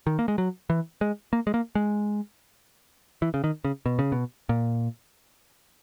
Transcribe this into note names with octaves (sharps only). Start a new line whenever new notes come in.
D#3
A#3
G#3
F#3
E3
G#3
A#3
G#3
A#3
G#3
E3
C#3
D#3
C#3
B2
C#3
B2
A#2